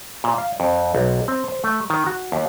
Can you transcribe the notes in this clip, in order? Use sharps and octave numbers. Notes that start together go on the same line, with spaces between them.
A#2
F5
F2
B1
C4
C5
A3
D#3
F#4
D#2